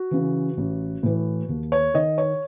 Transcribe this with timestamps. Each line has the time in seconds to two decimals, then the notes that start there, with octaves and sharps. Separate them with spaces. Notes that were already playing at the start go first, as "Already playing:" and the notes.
Already playing: F#4
0.11 C#3 E3
0.57 A1
1.03 A2 E3
1.49 D#2
1.72 C#5
1.94 D#3 D#5
2.18 C#5